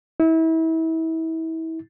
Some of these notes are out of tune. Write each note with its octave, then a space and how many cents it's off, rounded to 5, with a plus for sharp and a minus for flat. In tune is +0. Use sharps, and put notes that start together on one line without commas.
E4 -30